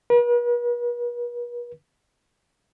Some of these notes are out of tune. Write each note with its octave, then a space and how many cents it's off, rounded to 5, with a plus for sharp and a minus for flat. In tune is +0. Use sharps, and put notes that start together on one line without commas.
B4 -45